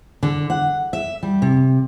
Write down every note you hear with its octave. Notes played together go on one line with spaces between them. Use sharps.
D3
F#5
E5
G3
C3